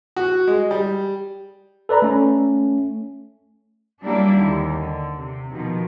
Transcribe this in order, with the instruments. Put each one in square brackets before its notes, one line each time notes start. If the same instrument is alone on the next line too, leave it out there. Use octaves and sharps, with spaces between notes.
[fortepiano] F#4
G#3
G3
[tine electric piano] A4 B4 D5 A#5 B5
A3 C#4
[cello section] F#3 G3 A#3 D4 E4 G4
D#2 D3
D3
C3
B2 D#3 F3